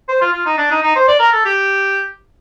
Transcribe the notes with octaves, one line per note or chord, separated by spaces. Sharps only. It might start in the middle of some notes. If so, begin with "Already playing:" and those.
C5
F4
F4
D#4
D4
D#4
D#4
C5
D5
A#4
A4
G4